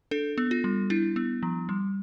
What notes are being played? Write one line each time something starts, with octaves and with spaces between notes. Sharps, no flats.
D4 A4
B3
F4
G3
D4 E4
B3
F3
G3